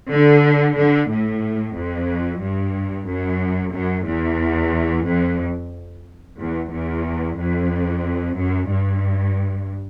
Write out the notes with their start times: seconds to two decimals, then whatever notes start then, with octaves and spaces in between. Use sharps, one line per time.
0.10 D3
0.77 D3
1.10 A2
1.76 F2
2.42 G2
3.08 F#2
3.74 F#2
4.07 E2
5.07 F2
6.40 E2
6.73 E2
7.39 F2
8.38 F#2
8.72 G2